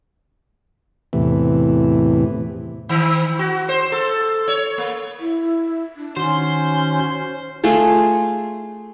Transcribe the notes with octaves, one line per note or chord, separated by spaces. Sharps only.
E2 A2 C3 E3
D#3
F#4
C5
A4
C#5
A#3
E4
D4
D#3 C#4 F#4 C5 C6 G6
A3 F4 G#4